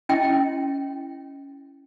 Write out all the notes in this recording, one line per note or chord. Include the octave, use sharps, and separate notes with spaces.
C#4 E4 D#5 G5